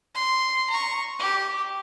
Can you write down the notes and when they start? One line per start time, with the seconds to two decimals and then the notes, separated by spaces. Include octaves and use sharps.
0.15 C6
0.70 A#5 C#6
1.19 G4